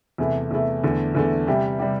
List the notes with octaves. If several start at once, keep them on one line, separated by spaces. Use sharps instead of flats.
E2 C3 A3 E4
E2 C3 A3 E4
E2 D3 A3
E2 D3 A3
C3 G3 E4 G4
C3 G3 E4 G4